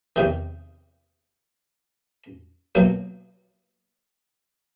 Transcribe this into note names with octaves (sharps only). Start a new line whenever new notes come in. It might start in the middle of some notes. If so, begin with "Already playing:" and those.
E2 C3 D#3
B2 F#3 A#3